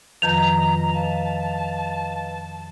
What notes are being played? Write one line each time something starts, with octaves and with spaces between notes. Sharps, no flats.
F2 D#3 F3 F4 B4 D#5 A#5 F7
B4 D#5 F5 A5